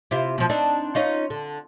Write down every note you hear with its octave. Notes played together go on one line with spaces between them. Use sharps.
C3 E4 F4
B2 F3
C4 D4 D#4
C#4 D#4 F4
D3